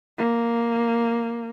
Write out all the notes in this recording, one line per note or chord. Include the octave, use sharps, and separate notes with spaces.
A#3